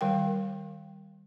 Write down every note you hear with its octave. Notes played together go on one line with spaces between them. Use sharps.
D#3 G3 A#4 F5 G5